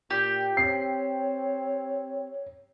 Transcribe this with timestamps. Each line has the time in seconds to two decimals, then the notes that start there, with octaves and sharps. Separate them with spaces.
0.10 A#2 G4
0.57 C4 C#5 C7